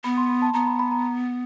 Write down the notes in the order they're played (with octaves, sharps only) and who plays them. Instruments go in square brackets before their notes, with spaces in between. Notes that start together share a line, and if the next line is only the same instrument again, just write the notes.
[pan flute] B3 [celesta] B5
[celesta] C6
B5
A5
[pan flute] B3 [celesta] A#5
[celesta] B5
B5
A#5